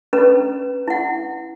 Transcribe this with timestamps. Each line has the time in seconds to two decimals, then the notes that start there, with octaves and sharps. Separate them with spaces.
0.13 C#4 B4 A#5
0.88 E4 F#5